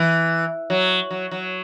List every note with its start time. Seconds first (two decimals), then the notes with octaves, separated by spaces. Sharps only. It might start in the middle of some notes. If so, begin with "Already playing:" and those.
Already playing: E3
0.70 F#3
1.11 F#3
1.31 F#3